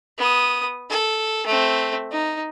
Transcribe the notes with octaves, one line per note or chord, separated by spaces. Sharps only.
B3 D#6
A4
A3 C4
D#4